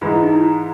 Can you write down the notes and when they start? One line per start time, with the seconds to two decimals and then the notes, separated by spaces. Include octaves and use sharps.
0.01 G#2 E3 G#3 F4
0.12 E4
0.23 D#4
0.33 E4